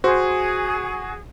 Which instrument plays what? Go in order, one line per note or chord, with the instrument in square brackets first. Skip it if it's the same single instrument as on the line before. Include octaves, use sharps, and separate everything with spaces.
[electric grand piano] F#4 [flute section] G#4 [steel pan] C5